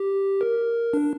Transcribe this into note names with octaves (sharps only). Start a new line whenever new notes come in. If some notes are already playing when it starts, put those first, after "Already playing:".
Already playing: G4
A#4
D4